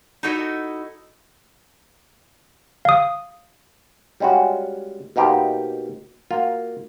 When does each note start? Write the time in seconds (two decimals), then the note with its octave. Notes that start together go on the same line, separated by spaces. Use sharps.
0.23 D#4 E4 F#4 A4 D#5
2.85 F5 D#6
4.20 G3 G#3 C#4 F4 F#4
5.16 B2 A#3 D#4 G4 C5 G5
6.31 A#3 F4 F#4